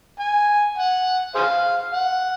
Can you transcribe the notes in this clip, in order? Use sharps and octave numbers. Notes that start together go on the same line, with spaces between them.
G#5
F#5
G#4 C5 F5
F#5